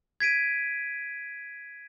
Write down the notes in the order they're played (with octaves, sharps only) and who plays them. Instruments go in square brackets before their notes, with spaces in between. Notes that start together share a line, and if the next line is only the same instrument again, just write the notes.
[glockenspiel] G#6 B6 D7 D#7